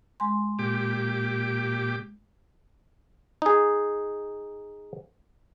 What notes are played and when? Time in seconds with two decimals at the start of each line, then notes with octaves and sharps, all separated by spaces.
0.20 G#3 G#5 C6
0.59 A#2 G4 D6
3.42 D#4 G#4